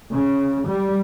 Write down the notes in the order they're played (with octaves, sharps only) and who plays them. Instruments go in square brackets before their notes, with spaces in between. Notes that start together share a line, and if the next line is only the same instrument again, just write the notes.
[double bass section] C#3
G3